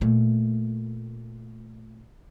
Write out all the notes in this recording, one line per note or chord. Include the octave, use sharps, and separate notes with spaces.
A#2 A3